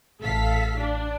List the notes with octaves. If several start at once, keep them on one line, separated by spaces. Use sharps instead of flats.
A1 A4 F5 B6
D4